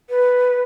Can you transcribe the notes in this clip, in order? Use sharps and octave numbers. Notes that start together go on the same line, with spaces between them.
B4